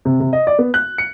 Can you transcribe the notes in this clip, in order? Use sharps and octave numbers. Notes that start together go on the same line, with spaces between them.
C3
C3
D#5
D5
B3
F#6
C#7